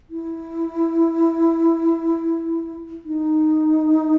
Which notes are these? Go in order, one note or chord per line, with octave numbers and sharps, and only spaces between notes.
E4
D#4